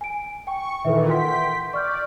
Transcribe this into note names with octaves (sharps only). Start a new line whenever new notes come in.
G#5 D7
G5 C#6
A#2 D#3 E3 A4 B4 E5
F#5 G5 C6 B6
D5 C#6 F6 G6